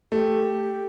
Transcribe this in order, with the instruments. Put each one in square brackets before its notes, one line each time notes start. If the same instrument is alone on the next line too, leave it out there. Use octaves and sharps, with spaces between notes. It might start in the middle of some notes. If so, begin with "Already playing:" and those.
[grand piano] A3 [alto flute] G4